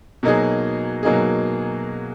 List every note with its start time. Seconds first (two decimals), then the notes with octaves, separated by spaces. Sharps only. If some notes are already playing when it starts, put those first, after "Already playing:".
0.23 B2 F#3 A#3 D#4 G#4
1.03 B2 F#3 A#3 D#4 G#4